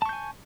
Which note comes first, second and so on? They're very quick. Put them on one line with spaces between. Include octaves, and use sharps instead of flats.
A5 C#6 G6 G#5